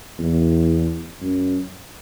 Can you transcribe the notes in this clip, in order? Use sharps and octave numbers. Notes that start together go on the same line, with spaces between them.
E2
F#2